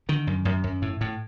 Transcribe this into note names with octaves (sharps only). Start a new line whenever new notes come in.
D3 D#3
F#2
F#2
F#2
A2
A2